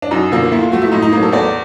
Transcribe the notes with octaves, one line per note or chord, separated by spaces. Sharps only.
D4
F#2 D#4
D3 F3 A#3
A#2 E4
F4
F3 A3 F#4
E4
A2 D#4
D#4
F#3 A#3
A4
E2 D5